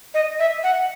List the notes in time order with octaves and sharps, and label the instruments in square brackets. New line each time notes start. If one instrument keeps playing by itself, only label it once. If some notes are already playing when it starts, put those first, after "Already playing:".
[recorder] D#5
E5
F#5